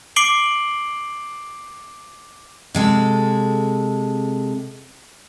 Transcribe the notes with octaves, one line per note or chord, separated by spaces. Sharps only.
D6 C7 D7 F#7 G7
C3 G#3 A4